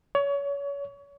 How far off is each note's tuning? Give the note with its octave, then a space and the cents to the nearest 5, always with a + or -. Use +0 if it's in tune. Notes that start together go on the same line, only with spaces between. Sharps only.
C#5 +30